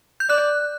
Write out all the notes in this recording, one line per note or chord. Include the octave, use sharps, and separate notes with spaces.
G6
D5 F#6